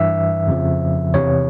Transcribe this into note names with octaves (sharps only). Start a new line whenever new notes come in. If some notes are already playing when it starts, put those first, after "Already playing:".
Already playing: G2 E3 E5
F2 C#3 F3
E2 C3 E3 C#5